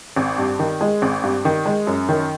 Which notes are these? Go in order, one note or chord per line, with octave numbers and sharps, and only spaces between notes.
G#1
G2
D#3
G#3
G#1
G2
D#3
G#3
F#2
D#3